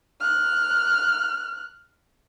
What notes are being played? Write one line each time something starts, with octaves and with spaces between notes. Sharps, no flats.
F6 F#6